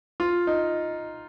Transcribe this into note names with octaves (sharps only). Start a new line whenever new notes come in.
F4
D#4